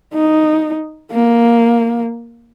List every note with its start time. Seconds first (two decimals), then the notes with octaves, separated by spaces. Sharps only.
0.13 D#4
1.11 A#3